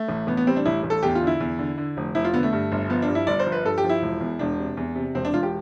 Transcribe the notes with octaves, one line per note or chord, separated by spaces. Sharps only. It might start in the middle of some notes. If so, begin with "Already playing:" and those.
Already playing: A3
A1
A1 B3
B3
G3 C4
D4
A1 E4
A1
A4
E2 G4
F4
D3
E4
E2
D3
D3
F1
F1 E4
F4
D3 B3
A3
G2
G1
F3 B3
D4
G2
E4
G1 D5
C5
F3
B4
G2 A4
G4
F3
E4
E1
E2
E1 D4
C3
E2
C3
E1 C4
D4
E1 F4
G4